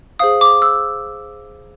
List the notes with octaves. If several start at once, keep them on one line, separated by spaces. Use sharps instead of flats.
G#4 C5 F5 D#6
D6
E6